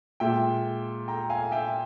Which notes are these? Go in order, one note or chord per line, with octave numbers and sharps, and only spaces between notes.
A#2 G#3 E5 G5
G5 A#5
F5 G#5
E5 G5